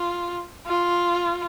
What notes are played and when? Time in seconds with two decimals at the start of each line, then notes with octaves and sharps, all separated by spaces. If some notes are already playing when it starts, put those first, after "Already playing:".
Already playing: F4
0.67 F4